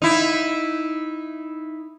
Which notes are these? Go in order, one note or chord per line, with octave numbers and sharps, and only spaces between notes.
D#4 E4